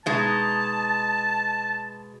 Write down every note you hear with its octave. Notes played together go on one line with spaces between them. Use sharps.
B2 G#3 D#4 A5